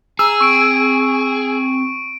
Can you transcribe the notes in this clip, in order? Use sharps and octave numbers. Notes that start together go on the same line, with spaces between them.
G#4 A#5 E6
C4 C#6 D7